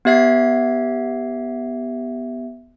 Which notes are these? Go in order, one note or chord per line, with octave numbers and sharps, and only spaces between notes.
B3 G4 E5 G#6 C7